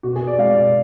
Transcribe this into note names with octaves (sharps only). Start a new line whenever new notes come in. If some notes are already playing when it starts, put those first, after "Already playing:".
B2 F#4
G#4
B3
D5
G#3 F5
D5
B2